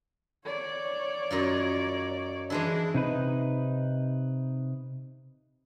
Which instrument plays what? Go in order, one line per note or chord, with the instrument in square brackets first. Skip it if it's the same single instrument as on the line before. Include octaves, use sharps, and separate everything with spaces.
[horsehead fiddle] C#5 D5
[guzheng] F#2 D#4 F4
[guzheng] E3 G#3 E4 [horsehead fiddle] D4 G#4
[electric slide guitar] C3 D#4 B4